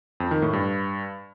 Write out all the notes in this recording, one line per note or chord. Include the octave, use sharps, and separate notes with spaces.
F2
D#3
A2
G2